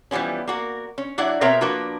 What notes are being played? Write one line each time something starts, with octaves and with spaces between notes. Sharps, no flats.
E3 F3 G3 B3 C#4
A#3 F#4 A#4
C#4
F#3 D4 E4 D5 F#5
B2 C4 A#4 C#5 E5 A#5
F3 A#3 D4 F#4 A#4 B4